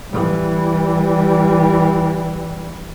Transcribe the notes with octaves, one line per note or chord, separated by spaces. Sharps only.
E3 G3